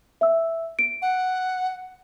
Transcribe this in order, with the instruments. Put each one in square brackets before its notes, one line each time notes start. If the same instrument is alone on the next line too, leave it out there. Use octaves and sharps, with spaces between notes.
[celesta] E5 E6
D7
[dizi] F#5